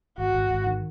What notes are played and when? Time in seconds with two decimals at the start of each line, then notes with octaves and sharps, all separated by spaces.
0.18 G#1 F#4
0.34 G#1
0.50 G#1
0.66 D#3